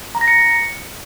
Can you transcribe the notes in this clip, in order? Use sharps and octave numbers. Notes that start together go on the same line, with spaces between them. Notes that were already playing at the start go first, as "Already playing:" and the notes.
A#5
A#6
C#7